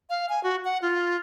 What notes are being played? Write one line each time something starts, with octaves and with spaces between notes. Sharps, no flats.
F5
G#5
F#4
F#5
F4